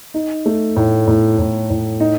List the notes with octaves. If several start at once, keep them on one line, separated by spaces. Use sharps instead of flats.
D#4
A3
A2
A2
A2
A2
D#4